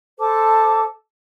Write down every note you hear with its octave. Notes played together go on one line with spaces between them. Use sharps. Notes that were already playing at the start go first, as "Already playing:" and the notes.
A4 C5 A5 D6